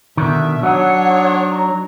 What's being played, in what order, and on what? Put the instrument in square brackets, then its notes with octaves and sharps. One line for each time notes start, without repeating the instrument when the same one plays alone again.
[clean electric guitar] B2 D3 D#3 [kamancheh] E5
[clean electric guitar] F#3 D#4 [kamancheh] D4 C#5 [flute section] F#5
[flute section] A#5